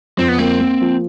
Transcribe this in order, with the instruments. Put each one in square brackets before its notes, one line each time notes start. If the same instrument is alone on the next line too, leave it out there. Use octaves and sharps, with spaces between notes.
[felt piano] F2 [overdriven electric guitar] C4
[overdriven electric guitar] B3
[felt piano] A#3 [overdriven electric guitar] C4
[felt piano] A#3
F3